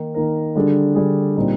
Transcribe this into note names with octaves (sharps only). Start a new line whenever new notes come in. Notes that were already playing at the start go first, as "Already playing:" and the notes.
Already playing: D#3 A#3 D#4 A#4
D#3 A#3 D#4 A#4
D3 G3 D4 G#4
D3 G3 D4 G#4
A#2 G3 C4 D#4